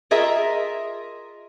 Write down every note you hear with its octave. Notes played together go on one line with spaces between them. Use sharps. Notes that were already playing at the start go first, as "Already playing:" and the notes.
F4 G#4 A#4 D#5 E5